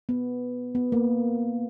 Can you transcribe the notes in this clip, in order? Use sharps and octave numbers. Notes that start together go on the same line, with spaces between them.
B3
B3
A#3